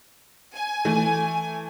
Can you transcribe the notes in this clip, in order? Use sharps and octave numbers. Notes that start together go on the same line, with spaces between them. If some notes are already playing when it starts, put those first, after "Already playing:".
G#5
E3 A3